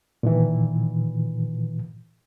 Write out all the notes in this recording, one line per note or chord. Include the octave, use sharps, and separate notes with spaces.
A#2 D#3 E3